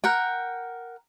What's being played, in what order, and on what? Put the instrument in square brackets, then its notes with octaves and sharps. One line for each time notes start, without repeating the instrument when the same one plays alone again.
[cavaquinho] A#4 F#5 G5